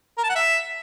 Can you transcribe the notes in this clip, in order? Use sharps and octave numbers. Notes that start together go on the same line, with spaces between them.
A#4
A5
F#5
E5